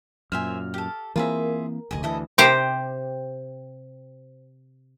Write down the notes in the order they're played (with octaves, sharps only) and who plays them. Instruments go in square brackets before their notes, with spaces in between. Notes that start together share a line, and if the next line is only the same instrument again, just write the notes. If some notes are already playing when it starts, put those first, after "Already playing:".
[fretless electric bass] F#2 A#2 [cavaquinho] C5 E5 G#5 [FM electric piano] F6
[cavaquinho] G4 A4
[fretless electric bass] E3 A#3 C4 [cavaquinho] F4 G#4 E5 [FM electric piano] A#4
[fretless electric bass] F1 D2 [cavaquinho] G#4 D#5
[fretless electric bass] D2 E3 [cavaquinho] E4 A4 D#5
[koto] C3 G4 C5